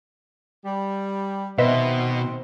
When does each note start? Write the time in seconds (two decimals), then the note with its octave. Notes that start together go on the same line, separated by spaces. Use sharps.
0.65 G3
1.58 B2 D#3 C4 B4 C5 D#5 E5